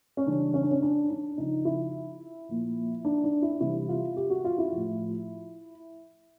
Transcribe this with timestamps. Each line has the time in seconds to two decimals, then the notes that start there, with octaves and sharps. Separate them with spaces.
0.17 C#4
0.26 C#3 E3 G3 D4
0.54 C#4
0.63 D4
0.71 C#4
0.82 D4
1.10 D4
1.38 C#3 F3 D#4
1.65 E4
2.49 A#2 F3
3.05 D4
3.24 D4
3.42 E4
3.60 C3 E3 G3 E4
3.89 F4
4.17 G4
4.30 F#4
4.45 F4
4.58 E4
4.72 A2 F3